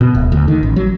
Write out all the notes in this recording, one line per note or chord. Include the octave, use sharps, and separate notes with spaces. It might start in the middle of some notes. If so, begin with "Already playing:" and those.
B2
D1
D2
D#3
A1
F#3